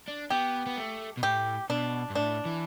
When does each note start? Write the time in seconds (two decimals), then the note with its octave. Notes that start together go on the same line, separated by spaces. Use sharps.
0.08 D4
0.30 B3 G4
0.66 B3
0.76 A3
1.17 B2
1.23 A2 G4
1.70 B2 D4
2.10 G2
2.15 A2 D4
2.46 E3